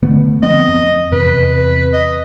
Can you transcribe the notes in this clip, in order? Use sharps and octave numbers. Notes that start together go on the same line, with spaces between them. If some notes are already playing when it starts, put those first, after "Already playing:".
D3 A3 B3
F3 B3 C4 D#5
F2
E2 C3 B4
D#5